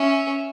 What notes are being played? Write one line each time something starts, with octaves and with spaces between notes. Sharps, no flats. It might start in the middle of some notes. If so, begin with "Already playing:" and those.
Already playing: C#4 E5